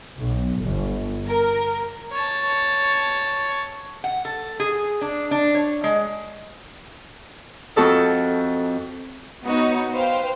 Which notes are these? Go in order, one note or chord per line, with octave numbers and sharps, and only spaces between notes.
B1
G1
A#4
C#5 A5
F#5
A4
G#4
D4
D4
C#5
G#3
F2 F#4 A4 D#5
B3 D#4 F#4 C#5
B4 C5 F5 G5